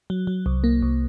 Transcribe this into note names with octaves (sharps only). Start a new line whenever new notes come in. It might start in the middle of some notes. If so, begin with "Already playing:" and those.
F#3
F#3
C2
A#3
C2